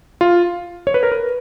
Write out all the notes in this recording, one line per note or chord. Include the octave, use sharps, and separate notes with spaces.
F4
C#5
B4
A#4
B4